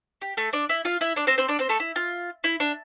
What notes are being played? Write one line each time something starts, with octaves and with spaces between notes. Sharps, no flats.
G4
A3 A4
D4 D5
E4 E5
F4 F5
E4 E5
D4 D5
C4 C5
C4 C5
D4 D5
C4 C5
A3 A4
E4
F4
E4
D4